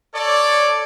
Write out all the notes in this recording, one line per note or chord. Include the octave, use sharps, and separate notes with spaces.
A4 C#5 D5